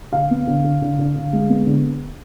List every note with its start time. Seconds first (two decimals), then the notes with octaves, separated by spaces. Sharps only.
0.13 D3 F5
0.30 B3
0.47 D3
0.64 D3
0.82 D3
0.99 D3
1.16 D3
1.33 G#3
1.49 B3
1.67 D3